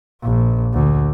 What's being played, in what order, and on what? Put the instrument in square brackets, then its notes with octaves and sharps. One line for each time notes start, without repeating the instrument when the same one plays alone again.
[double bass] A#1
D2